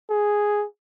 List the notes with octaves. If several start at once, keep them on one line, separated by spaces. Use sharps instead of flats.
G#4